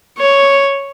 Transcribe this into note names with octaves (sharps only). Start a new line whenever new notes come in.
C#5